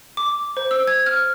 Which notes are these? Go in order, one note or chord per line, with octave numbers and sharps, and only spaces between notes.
D6
C5
E6
G#6
F6